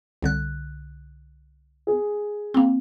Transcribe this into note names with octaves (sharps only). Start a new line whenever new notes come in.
C2 D3 F#6
G#4
A#3 C4